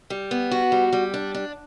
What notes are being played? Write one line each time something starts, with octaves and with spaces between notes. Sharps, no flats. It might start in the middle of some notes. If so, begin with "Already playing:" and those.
G3
B3
F#4
G3
G3
D4
D4